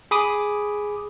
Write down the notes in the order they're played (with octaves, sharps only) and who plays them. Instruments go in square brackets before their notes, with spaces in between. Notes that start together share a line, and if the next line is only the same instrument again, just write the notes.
[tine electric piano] G#4 B5 D6 D#6